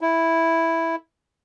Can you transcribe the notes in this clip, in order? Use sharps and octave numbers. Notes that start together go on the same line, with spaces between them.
E4